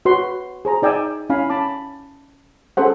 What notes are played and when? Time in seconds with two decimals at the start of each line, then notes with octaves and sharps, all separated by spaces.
0.05 F#4 B4 C#5 F#5 C6
0.65 G#4 C5 A#5
0.82 D#4 D5 G5 G#5 E6
1.30 C#4 E4 F5 G#5 B5
1.50 C#4 A5 B5 D6
2.77 C#4 G#4 A4 C5 F#5